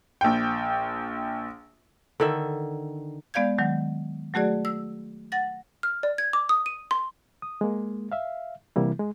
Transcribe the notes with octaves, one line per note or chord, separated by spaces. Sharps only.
A#1 G5
D3 D#3 E5
G#3 B3 D5 F5 G6 G#6
D#3 F#3 G#3
F#3 A3 F#4 G#4 D5
E6
F#5 A6 A#6
F6
D5
G#6
D6
D#6
D#7
C6
D#6
G#3 A#3
E5 F5
C3 E3 G3 A#3 E4
G#3